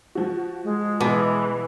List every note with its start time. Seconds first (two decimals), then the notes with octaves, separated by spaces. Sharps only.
0.15 F3 F#4
0.64 G#3
1.01 B2 E3 D6